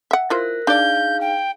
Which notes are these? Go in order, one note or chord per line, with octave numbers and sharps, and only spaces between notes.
E5 F#5
E4 F4 A#4 C5 F#6 A#6
D4 D#4 G#4 D5 F5 G6
G5